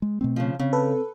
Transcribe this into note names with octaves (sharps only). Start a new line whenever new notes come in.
G#3
B2 A3 C4
C#3 F3
C#3 C4
A4 B4